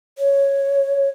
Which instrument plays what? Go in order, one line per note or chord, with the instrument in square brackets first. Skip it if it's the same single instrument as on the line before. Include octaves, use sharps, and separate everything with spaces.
[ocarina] C#5